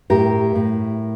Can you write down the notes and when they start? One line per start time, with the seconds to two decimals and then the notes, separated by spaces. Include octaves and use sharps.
0.10 A2 G4 A#4
0.55 A2